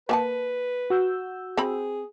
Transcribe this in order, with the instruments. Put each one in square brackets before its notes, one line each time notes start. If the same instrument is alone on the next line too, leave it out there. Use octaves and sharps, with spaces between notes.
[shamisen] A#3 G#5 A5 [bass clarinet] B4
[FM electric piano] F#4 E6 G6
[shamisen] C4 B5 [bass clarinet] G#4